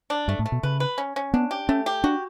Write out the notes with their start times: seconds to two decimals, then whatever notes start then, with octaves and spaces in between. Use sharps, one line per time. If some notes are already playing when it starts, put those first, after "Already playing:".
0.10 D4
0.28 G2 A3
0.39 A2
0.46 A3
0.52 B2
0.63 C#3 B4
0.80 B4
0.98 C#4
1.16 C#4
1.34 B3 D4
1.51 G4
1.69 A3 C#4
1.86 G4
2.04 D4 F#4